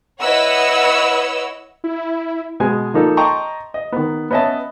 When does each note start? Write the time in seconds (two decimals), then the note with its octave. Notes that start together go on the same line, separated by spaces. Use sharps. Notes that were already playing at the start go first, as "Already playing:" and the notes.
0.20 E4 B4 C#5 D#5 F#5 E6
1.84 E4
2.60 B2 G#3 G#5
2.94 F3 A#3 D#4 A4
3.17 D#5 G5 A5 A#5 C6 C#6
3.74 D#5
3.92 D#3 B3
4.31 B3 C#4 D#5 E5 A5